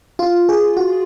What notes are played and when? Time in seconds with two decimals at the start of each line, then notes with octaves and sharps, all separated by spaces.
0.19 F4
0.49 G#4
0.77 F#4